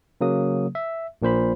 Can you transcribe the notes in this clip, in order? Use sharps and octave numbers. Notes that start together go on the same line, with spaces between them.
C#3 F#3 A#3 D#6
E5
A#1 A#2 C5 B5